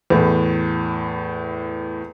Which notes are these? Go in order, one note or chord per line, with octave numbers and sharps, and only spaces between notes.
E2 A2